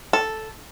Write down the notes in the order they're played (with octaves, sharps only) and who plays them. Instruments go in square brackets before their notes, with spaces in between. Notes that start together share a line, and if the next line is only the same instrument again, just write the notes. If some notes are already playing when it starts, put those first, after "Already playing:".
[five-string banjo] A4